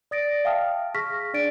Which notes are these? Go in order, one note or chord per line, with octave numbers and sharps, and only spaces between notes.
D5 D#6 A6 A#6 D7
E5 F5 G5 A5 D#6 F6
G#4 C#6 F6 A#6 B6
D4 D5 A6 D7